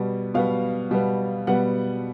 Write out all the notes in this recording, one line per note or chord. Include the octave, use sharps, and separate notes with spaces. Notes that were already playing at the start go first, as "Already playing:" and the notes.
Already playing: B2 G3 B3
B2 G3 B3 F5
B2 G3 B3
B2 G3 B3 F#5